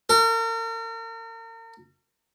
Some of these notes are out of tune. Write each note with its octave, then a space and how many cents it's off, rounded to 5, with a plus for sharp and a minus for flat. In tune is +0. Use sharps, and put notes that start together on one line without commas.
A#4 -40